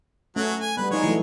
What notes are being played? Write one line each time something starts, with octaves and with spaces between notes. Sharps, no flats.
F#3 A3 C#4 F#4
G#5
G3 B3 B4
F3 G#3 D#4 C#5
E3 F#3 A3